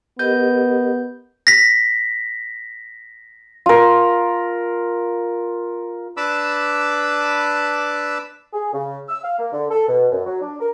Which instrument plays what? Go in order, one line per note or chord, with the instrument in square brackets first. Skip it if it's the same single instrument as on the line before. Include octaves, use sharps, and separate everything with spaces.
[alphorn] B3 [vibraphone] G4 A#4 D#5 [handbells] G6
[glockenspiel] A#6 B6
[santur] F4 A#4
[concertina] D4 B4 A5 B5 D6 E6
[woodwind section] G#4
C#3
E6
F5
A#3
D3
A4
B2
F#2
F#3
D4
A#4